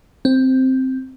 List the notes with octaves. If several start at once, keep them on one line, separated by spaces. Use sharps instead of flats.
C4